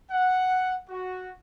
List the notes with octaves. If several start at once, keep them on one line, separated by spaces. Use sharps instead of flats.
F#5
F#4